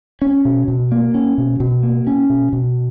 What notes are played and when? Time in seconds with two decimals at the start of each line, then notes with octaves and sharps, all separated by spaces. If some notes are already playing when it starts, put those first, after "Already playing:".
0.22 C#4
0.45 B2
0.68 B2
0.92 A#3
1.14 C#4
1.38 B2
1.60 B2
1.83 A#3
2.07 C#4
2.30 B2
2.53 B2